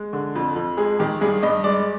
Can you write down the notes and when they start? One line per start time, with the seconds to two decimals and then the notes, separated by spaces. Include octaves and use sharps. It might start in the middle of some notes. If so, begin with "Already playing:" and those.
Already playing: G#3
0.13 D3
0.35 F2
0.56 F2
0.77 G#3 G#4
0.99 D#3 G4
1.21 G2 G#4
1.42 G2 D#5
1.64 G#3 D5